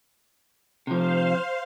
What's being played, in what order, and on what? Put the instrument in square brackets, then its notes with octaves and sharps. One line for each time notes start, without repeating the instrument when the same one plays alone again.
[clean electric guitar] C3 F3 [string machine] C5 F5